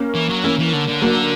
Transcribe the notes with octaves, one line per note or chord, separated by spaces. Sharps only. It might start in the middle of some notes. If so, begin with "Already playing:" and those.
Already playing: A#3 C#4
E3
F#3
E3 A#3 C#4
E3
D3
D3
F#3 A#3